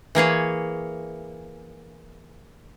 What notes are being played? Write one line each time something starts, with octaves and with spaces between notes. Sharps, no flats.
E3 A#3 G#4 C#5